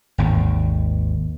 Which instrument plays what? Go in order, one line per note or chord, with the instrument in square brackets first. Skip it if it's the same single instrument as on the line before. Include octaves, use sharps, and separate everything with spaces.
[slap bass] G#1 D#2